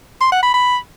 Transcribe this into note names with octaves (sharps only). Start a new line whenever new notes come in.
C6
F#5
B5
B5